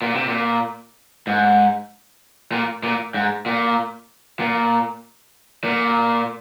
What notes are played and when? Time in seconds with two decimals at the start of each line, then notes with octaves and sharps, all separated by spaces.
0.02 A#2
0.15 C3
0.28 A#2
1.27 G#2
2.52 A#2
2.83 A#2
3.14 G#2
3.46 A#2
4.40 A#2
5.64 A#2